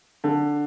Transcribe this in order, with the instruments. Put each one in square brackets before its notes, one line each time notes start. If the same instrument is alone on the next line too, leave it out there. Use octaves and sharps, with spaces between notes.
[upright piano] D3